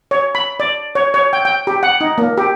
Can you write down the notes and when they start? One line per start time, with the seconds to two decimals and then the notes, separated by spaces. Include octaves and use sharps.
0.11 C#5
0.35 B5
0.60 D5
0.95 C#5
1.14 C#5
1.33 G5
1.45 G5
1.67 G4
1.83 F#5
2.01 D#4
2.18 A#3
2.38 G4